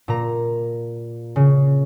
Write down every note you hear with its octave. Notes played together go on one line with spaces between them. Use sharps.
A#2 A#5
C#3